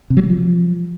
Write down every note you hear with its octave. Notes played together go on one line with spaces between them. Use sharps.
C3
F#3
G3
F3